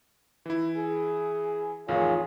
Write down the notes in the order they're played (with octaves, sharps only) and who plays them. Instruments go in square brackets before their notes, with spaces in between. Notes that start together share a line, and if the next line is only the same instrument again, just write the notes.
[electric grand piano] E3 E4
[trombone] G#4
[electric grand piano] A1 F2 D#3 [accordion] F4 G#4 [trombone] C#5